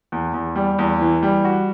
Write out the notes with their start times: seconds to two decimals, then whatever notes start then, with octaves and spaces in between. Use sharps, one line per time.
0.12 E2
0.34 E2
0.56 G3
0.79 E2
1.01 E3
1.23 G3
1.45 F#4